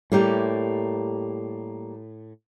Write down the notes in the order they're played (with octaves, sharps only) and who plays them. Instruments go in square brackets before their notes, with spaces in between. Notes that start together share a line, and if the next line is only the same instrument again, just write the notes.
[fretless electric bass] A2 [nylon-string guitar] G3 A#3 G4